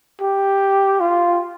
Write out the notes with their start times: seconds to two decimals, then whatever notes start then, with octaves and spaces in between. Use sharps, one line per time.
0.21 G4
1.00 F4